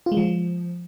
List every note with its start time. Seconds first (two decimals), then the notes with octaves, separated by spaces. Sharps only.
0.06 F4
0.12 G#3
0.17 F3